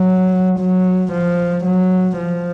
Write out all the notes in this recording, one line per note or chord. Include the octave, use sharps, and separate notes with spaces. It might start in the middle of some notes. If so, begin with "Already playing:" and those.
Already playing: F#3
F#3
F3
F#3
F3